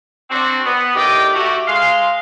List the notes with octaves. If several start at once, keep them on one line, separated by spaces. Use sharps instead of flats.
C4 D4 F#4
B3
A2 D#3 G4 D5 D#5 G5
A3 F#4 G4
G#3 F5 C6